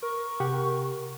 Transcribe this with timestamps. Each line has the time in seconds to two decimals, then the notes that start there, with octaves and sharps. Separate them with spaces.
0.03 A#4 C#6
0.40 C3 G4 F#5